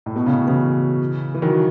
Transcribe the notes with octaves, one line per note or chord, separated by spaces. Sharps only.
A2
B2
A2 C#3
C#3 E3
E3
D#3 F#3